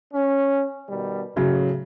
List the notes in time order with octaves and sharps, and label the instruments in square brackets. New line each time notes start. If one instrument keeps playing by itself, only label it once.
[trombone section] C#4
B2 D#3 G3
[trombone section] A2 [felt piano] C#3 F#3